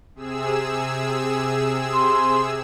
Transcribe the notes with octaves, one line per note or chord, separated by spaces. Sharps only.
C3 G#4 E6
C6